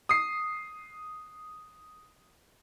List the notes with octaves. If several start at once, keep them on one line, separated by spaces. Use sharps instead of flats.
D#6 C7